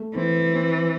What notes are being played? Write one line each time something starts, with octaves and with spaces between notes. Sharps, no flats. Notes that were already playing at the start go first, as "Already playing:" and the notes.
Already playing: A3
E3 C4
C4